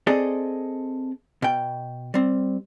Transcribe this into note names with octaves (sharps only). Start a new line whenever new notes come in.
C4 G#4 A4 D5 D#5
B2 G5
G3 C4